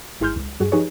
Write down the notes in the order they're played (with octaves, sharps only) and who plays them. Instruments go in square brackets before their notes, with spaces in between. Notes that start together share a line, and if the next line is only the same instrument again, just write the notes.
[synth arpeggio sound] G#1 E4 G#4 C6 F6 G6
C#2
G2 F#4 G#4
F3 D#4 G4 G#4 B4 C#5